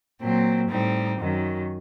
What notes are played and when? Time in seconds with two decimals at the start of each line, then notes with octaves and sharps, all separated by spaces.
0.20 A#2 F#3 C4
0.69 A2 G3 C4 D#4
1.19 F#2 D#3 F#3